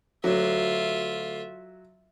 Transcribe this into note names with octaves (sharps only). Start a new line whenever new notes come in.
D2 F#3 F4 E5